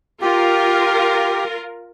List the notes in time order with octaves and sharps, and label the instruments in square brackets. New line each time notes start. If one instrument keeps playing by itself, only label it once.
[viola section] F4 A#4 [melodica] G4